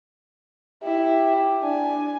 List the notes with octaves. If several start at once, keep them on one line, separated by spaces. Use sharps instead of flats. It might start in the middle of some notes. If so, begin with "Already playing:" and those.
E4 G4
D4 G#5